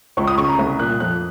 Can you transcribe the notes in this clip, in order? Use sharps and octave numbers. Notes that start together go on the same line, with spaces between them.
C#2 C#6
D#6
C#3 C#6
A#5
C2
A#2 F#6
F2 F#6